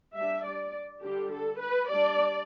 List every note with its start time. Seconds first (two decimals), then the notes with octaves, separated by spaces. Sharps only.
0.14 G3 D4 E5
0.45 D5
1.02 D3 G3 D4 G4
1.32 A4
1.60 B4
1.90 G3 D4 D5